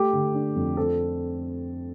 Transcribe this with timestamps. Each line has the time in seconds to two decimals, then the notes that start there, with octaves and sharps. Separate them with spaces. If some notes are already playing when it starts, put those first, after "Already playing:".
Already playing: A3 G4
0.13 D3
0.35 D4
0.56 F2
0.77 C4 A4